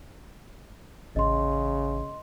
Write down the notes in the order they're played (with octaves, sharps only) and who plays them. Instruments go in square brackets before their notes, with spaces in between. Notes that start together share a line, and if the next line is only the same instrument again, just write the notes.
[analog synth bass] A1 [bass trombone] C#3 [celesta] D#5 C6